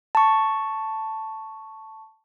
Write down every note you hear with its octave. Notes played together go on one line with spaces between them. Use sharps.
A5 C#6